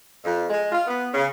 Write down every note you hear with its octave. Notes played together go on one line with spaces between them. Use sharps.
F2
G#3
F4
B3
C#3